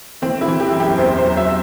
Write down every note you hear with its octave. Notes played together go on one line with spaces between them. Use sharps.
E3 C4
E4
E3
G4
F#2
G4
E2 C5
C5
F#3
E5